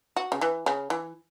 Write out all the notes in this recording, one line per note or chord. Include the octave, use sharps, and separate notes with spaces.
F#4
C#3
E3
C#3
E3